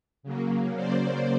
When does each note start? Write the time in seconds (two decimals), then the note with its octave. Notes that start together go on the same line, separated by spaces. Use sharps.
0.23 C#3 F#3 A#3
0.75 C5 D5